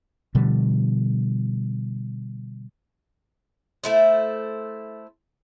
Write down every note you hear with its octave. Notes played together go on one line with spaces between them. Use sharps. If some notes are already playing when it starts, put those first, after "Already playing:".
B2 D3 F3 G3
A3 E4 C5